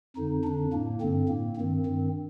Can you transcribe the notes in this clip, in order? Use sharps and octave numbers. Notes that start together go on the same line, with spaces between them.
F2 D3 D#4
F2 D3 D4
A2 A#3
G2 D3 C4
A2 A#3
G2 D#3 C4
G2 D#3